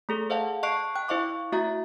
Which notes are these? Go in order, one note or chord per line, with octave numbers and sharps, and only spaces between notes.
A3 G#4 A4
C5 D#5 F5 F#5 A5
D#5 A5 C#6 F#6 C7 D7
G5 F#6
E4 C5 D#5 F5 C#6 D6
A3 E4 F#4 E5 A#5 A6